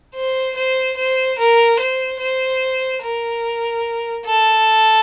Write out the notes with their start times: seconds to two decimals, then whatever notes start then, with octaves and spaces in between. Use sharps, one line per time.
0.14 C5
0.56 C5
0.97 C5
1.38 A#4
1.80 C5
2.20 C5
3.03 A#4
4.26 A4